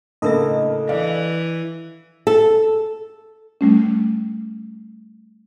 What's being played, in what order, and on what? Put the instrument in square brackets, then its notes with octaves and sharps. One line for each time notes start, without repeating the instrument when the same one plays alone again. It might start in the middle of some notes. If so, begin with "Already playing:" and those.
[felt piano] A2 C#3 A#3 [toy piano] D4 A#4 E5 [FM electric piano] A4 D#5
[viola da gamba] E3 [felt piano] D5 F5
[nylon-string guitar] A4
[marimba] G3 A3 C#4